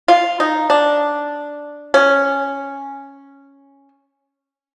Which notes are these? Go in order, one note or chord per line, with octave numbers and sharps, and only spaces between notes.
F4
D#4
D4
C#4